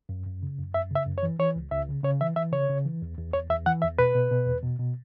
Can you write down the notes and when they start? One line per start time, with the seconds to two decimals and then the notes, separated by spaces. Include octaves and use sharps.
0.09 F#2
0.26 F#2
0.43 C#3
0.59 F#2
0.74 F#2 E5
0.91 C#3 E5
1.06 F#2
1.18 C#5
1.23 E3
1.39 E3 C#5
1.56 C#2
1.71 C#2 E5
1.89 C#3
2.04 C#3 C#5
2.20 E3 E5
2.36 E3 E5
2.52 C#3 C#5
2.70 C#3
2.86 E3
3.02 E2
3.17 E2
3.33 E2 C#5
3.50 E2 E5
3.66 E3 F#5
3.82 E2 E5
3.99 B2 B4
4.15 B2
4.31 B2
4.47 E2
4.63 B2
4.79 B2